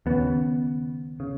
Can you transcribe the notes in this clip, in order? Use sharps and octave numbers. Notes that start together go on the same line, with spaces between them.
D#2 C#3 B3
C#3